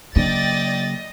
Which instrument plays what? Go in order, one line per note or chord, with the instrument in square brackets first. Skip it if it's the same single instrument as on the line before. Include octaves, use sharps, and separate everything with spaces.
[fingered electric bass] C#3 F#3 A#3 [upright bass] D4 [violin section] D5 G5 A6 [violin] D#5